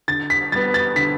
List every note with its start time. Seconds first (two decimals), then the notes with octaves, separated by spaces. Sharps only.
0.08 D3 A6
0.30 B6
0.52 G3 A6
0.55 B3
0.74 A6
0.96 D3 B6